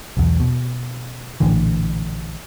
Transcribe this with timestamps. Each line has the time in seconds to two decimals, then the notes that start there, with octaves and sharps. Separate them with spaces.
0.17 B1 E2
0.40 B2
1.40 A#1 A2 D3 E3